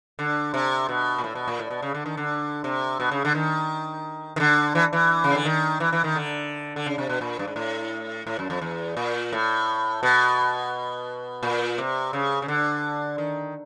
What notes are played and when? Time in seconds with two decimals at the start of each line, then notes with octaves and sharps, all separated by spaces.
0.19 D3
0.54 C3
0.89 B2
1.18 A#2
1.24 A2
1.35 B2
1.48 A#2
1.59 A2
1.70 B2
1.82 C#3
1.94 D3
2.06 D#3
2.17 D3
2.64 C3
3.00 B2
3.11 C#3
3.25 D3
3.35 D#3
4.36 D#3
4.40 D3
4.75 E3
4.93 E3
5.24 C#3
5.35 D3
5.45 D#3
5.80 E3
5.93 E3
6.04 D#3
6.16 D3
6.76 D3
6.86 C#3
6.98 C3
7.09 B2
7.21 A#2
7.39 G2
7.48 G#2
7.56 A2
8.27 A2
8.39 F#2
8.50 F2
8.61 E2
8.97 A#2
9.32 A2
10.03 B2
11.43 A#2
11.78 C3
12.13 C#3
12.42 C#3
12.48 D3
13.18 D#3